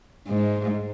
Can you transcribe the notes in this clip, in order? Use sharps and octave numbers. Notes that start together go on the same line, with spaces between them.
G#2